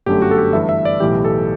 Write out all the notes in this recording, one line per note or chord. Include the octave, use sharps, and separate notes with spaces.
G1 F#2 D3 A3 G4
F#4
A4
G4
G2 E3 A3 E5
E5
D5
B1 A2 E3 G4
A4